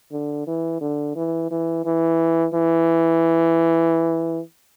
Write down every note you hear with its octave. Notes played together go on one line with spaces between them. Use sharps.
D3
E3
D3
E3
E3
E3
E3